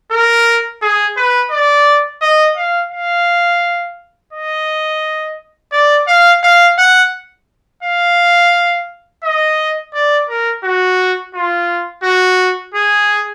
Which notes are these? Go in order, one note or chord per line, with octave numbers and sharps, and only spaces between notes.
A#4
G#4
B4
D5
D#5
F5
F5
D#5
D5
F5
F5
F#5
F5
D#5
D5
A#4
F#4
F4
F#4
G#4